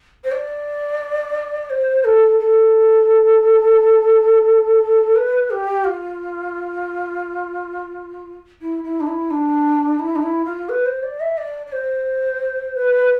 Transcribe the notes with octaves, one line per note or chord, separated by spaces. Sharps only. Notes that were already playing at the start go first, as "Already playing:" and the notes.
C5
D5
C5
A4
A4
B4
G4
F4
E4
E4
D4
E4
D4
E4
D4
E4
F4
B4
C5
D5
E5
D5
D5
C5
B4